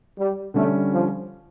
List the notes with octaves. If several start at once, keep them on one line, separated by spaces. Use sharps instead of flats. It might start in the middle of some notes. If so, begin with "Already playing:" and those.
G3
D3 G3 A3 C#4
F3